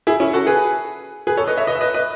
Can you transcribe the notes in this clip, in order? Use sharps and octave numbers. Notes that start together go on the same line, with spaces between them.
E4 G#4
C#4 E4
F#4 A4
G#4 B4
G#4 B4
A4 C#5
B4 D#5
C#5 E5
B4 D#5
E5
B4 D#5
B4 D#5